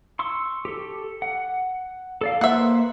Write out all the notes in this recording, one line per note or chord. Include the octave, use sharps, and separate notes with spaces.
C6 C#6 E6
G4 A4
F#5
A4 D5 F5
A#3 B4 C5 E5 F#5